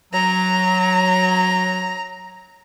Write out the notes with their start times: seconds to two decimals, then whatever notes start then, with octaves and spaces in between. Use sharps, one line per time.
0.13 F#3 A#5